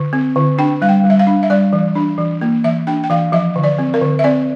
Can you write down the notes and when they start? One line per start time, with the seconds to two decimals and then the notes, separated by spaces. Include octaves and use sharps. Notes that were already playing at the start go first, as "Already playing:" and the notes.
Already playing: D3
0.13 C4
0.36 D3
0.58 D4 G5
0.82 G3 F5
0.89 G5
1.04 G3
1.10 E5
1.19 F5
1.27 D4
1.43 E5
1.50 G3 D5
1.73 E3
1.95 D4
2.18 E3
2.41 A#3
2.64 E3 E5
2.87 D4 G5
3.04 G5
3.10 E3 F5
3.32 F3 E5
3.56 D3
3.64 D5
3.78 C4
3.94 A#4
4.02 D3
4.19 E5
4.24 C4 D5